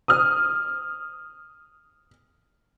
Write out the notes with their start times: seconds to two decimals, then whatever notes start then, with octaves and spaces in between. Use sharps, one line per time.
0.08 D#6 F6